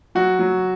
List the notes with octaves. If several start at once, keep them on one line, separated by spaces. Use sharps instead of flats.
F#3 F#4
F#3